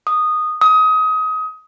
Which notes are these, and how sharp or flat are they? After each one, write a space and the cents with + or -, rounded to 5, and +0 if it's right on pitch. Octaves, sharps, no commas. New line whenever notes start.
D#6 -10
D#6 +25